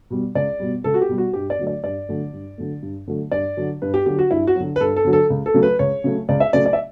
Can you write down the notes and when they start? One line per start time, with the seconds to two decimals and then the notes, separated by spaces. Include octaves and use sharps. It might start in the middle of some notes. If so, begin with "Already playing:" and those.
0.10 B2 G3
0.35 C#2 D5
0.60 B2 G3
0.84 C#2 A4
0.94 F#4
1.01 G4
1.09 B2 G3
1.18 F#4
1.33 G2 G4
1.50 D5
1.59 D3 F#3 A3
1.67 D5
1.84 G2 D5
2.09 D3 F#3 A3
2.33 G2
2.58 D3 F#3 A3
2.82 G2
3.07 D3 F#3 A3
3.32 G2 D5
3.57 D3 F#3
3.82 G2 B4
3.94 G4
4.06 D3 F#3 G4
4.19 F#4
4.31 G2 E4
4.47 F#4
4.55 D3 F#3
4.76 B4
4.81 G2 A4
4.96 A4
5.05 D3 F#3
5.13 A4
5.30 C#2
5.46 A4
5.54 C#3 F#3 A3
5.63 B4
5.79 C#2 C#5
6.04 C#3 F#3 A3
6.29 C#2 D5
6.40 E5
6.53 C#3 F#3 A3 D5
6.66 D5
6.73 E5